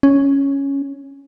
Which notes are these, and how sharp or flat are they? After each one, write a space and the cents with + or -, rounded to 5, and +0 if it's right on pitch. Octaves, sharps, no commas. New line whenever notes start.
C#4 +0